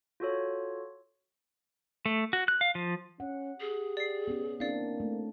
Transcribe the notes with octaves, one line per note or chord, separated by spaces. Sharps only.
F4 F#4 A4 C#5
A3
F#4
F#6
F5
F3
C#4 F#5
G4 G#4
D5 C7
B3 C#4
A#3 C4 D4 E4 D5 F5
A3